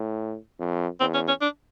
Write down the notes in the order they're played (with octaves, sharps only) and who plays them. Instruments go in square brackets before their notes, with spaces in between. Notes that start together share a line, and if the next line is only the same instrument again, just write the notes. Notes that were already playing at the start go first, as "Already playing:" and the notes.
Already playing: [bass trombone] A2
F2
[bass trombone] E2 [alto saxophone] C4
[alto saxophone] C#4
C#4
D4